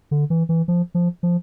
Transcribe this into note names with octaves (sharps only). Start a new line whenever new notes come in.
D3
E3
E3
F3
F3
F3